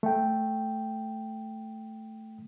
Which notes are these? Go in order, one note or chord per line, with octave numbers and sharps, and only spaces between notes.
A3 G5